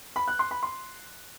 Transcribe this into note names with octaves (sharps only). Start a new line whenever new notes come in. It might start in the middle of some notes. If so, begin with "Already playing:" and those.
B5
F#6
C6
B5
C6